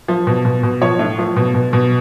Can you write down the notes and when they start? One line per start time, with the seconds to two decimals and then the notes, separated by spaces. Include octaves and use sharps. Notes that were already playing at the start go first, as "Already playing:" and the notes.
0.08 F3
0.27 B2
0.45 B2
0.63 B2
0.81 F3 C#5
0.99 A2
1.19 F3
1.36 B2
1.54 B2
1.73 B2